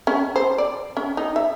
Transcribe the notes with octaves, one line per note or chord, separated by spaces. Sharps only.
C#4
C5
D5
C#4
D#4
E5